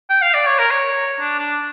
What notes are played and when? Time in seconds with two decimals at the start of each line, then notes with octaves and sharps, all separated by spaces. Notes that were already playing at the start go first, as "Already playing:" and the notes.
0.10 G5
0.22 F5
0.34 D5
0.46 C#5
0.59 A#4
0.71 C#5
1.20 D4
1.39 D4